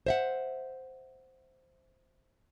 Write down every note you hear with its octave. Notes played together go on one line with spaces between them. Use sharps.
C5 E5 F#5